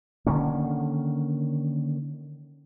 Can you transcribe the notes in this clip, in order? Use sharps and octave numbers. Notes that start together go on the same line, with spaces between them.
D3 D#3 A#3 C#4